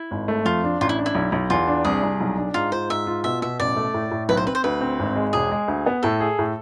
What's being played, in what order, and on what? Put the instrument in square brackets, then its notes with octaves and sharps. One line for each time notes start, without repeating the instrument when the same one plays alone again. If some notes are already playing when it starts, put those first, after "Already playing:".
Already playing: [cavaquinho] E4
[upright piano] G#1
A3
[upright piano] F2 [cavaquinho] F4
[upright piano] D4
[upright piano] A1 [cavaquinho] F4
[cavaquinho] E4
[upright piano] D4
[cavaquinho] E4
[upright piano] B1
B1
[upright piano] E2 [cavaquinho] F4
[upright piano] D4
[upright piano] C2 [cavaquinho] G#4
[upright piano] C2
B1
D4
[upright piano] G#2 [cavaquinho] F4
[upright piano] F4 [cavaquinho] C5
[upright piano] G#2 [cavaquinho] E5
[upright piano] F4
[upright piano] B2 [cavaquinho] E5
[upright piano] B2 [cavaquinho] E5
[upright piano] A1 [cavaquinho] D5
[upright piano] A3
A2
A2
[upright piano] B1 [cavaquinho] B4
[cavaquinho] C5
[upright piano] C4 [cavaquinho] B4
[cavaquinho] C5
[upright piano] D2 [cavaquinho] B4
[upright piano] C4
G#1
G#3
[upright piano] E1 [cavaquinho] G#4
[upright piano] G#3
D2
B3
[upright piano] A2 [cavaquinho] A4
[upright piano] G#4
A2